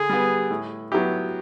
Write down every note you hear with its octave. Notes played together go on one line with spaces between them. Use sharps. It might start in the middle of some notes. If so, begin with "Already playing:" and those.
Already playing: D3 G#4
G3 B3
A2
F#3 B3 E4 G4